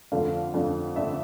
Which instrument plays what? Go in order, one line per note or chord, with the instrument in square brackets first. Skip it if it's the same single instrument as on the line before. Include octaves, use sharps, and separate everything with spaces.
[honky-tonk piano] F2 D3 A3 D4 F5
F2 D3 A3 D4
D3 A3 D4 E5